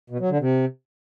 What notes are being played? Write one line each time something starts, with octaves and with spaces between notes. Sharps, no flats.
B2
F#3
D3
C3